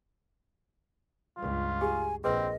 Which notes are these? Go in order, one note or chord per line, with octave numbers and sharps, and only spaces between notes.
C#2 G2 F4
G4 G#4 G#5
A#1 C4 G#4 B4 D#5 C6